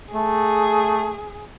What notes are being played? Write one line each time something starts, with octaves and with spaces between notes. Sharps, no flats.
A3 G#4